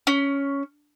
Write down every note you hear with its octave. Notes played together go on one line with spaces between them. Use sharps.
C#4